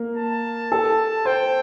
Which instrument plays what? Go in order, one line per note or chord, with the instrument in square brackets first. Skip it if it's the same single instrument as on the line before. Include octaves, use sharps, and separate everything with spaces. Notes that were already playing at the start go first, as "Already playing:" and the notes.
Already playing: [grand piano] A#3
[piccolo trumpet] A5
[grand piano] A4
[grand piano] C5 [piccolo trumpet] G5